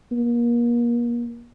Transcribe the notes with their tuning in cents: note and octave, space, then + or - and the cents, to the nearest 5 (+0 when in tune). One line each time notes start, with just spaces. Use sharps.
A#3 +35